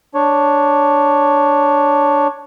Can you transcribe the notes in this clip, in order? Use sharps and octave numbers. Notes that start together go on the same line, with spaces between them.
D4 C#5